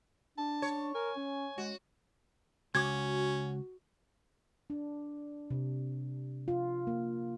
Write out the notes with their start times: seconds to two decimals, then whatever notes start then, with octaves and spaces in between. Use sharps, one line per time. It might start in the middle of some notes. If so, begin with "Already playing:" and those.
0.38 D4 A5
0.62 C#5
0.95 A#4 G#5
1.16 C#4
1.58 G#3 F#4
2.75 C#2 C#4 F#4 D6 G#6
4.70 D4
5.51 C3
6.48 F4
6.87 A#3